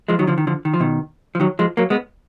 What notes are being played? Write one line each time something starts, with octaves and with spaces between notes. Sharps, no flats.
F3 G#3
D#3 F#3
D3 F3
D#3
D3 F3
D#3
F3
B2 D#3
F3
D#3 F#3
F3 G#3
F#3 A#3
G#3 B3